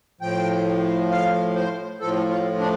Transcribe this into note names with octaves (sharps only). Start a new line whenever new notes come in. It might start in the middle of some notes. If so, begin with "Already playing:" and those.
A2 F3 G5
F5
C5
A2 F3 A4
F4
D4